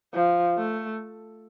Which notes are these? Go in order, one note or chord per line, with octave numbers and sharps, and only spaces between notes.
F3
A3